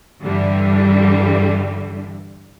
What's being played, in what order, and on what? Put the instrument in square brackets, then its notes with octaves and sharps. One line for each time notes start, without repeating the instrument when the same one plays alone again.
[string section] G2 D3 E3 G3